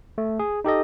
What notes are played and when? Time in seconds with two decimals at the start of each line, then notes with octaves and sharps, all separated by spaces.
0.18 A3
0.39 G#4
0.64 D#4 G4 A4 D#5